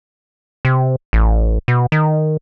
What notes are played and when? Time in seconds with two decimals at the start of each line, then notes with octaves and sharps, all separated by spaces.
0.65 C3
1.13 A1
1.68 B2
1.92 D#3